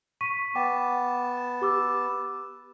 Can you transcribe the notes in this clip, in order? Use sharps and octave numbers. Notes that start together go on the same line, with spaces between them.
C#6 B6 D#7
B3 F#5 G5 A5 D6
G4 D6 E6